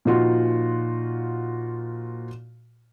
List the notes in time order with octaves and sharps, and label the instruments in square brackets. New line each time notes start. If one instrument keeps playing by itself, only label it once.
[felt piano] A#2 F3 D#4 F4 F#4